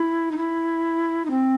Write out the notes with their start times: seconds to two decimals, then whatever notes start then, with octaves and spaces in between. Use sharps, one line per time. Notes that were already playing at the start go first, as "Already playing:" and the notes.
Already playing: E4
0.31 D#4
0.37 E4
1.25 D#4
1.30 C4